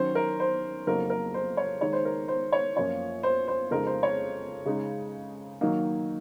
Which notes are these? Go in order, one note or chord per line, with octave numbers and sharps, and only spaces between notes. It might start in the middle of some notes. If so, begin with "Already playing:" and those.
Already playing: D#3 F#3 C#4 C5
A#4
C5
F2 C#3 F#3 A#3 D#4 A#4
A#4
C5
C#5
D#3 G#3 D#4 C#5
C5
A#4
C5
C#5
F#2 F3 A#3 C#4 F4 C#5
C5
C5
F2 C#3 G#3 D#4 A#4
C5
C#5
C#3 G#3 D#4
D#3 F#3 A#3 D#4